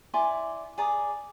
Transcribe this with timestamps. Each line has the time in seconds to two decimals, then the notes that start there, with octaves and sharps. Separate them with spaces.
0.14 E4 D5 G#5 C6
0.78 G#4 D5 A#5 D#6